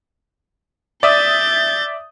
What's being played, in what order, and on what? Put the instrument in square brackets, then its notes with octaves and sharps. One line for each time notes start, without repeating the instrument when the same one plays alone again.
[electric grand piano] D5 E5 D#6 [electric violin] G6 A6